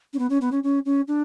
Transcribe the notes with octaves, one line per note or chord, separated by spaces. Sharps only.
C#4
B3
C#4
B3
C#4
C#4
C#4
D4